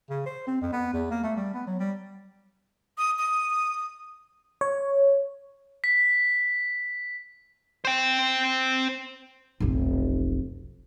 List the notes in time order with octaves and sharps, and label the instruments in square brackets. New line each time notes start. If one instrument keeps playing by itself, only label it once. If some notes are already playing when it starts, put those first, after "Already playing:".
[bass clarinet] C#3
C5
C4
F2
B3
E2
A#3
A3
G3
B3
F#3
G3
[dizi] D#6
D#6
[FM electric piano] C#5
[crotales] B6
[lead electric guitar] C5 G5
[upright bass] F1 B1